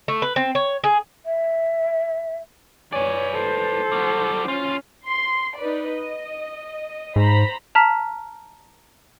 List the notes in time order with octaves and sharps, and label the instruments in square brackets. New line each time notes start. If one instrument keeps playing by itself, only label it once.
[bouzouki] A3
B4
C4
C#5
G#4
[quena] E5
[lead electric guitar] B4 D5 [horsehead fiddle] C#5 G#5
[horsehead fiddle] A4 C5
[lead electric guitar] F#3 G3
[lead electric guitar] D#2 F4 [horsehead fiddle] C#4
[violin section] C6
D#4 B4 D5
D#5
[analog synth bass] G#2 [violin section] C5 A#5 B5
[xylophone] A5 A#5 F6 B6